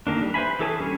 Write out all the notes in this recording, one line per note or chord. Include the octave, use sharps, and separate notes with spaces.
D3 D#3 A#3 D4
G3
B4 C5 E5 G#5 B5
E3 G#4 A4 C#5 G#5
G3 C#4 D4 C#5